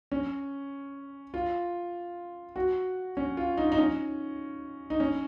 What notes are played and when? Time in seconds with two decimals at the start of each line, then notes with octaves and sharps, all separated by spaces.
0.12 C#4
1.34 F4
2.56 F#4
3.17 C#4
3.37 F4
3.58 D#4
3.72 D#4
3.78 C#4
4.90 D#4
5.00 C#4